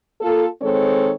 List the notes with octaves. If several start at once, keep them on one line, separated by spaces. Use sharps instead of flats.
A#3 F4 A4
D#3 G#3 C4 A4 C#5